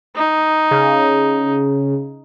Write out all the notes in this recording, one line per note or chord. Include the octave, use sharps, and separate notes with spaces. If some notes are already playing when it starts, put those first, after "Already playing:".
D#4
C#3